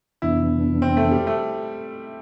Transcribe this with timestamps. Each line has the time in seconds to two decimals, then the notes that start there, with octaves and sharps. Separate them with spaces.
0.22 F2 C3 E3 B3 D4 E4
0.82 C4
0.97 A3
1.11 G3
1.27 A3